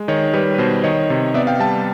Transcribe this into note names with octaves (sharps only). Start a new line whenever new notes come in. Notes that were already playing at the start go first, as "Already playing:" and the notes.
Already playing: G#3
D#3 C#5 D#5
G3 B4 C#5
B4
B2 C5
D#3 C#5 D#5
C3
B3 D5 E5
F5 G5
G3 G5 A5